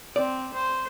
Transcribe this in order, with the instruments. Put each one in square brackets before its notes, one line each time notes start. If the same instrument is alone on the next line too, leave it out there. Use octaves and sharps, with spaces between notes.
[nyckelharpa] C4 [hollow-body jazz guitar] D5
[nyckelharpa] C5